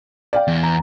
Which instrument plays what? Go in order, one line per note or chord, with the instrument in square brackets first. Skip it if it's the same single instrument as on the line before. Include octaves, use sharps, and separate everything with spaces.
[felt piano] D5 F5 G5
[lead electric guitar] E2
[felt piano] A#5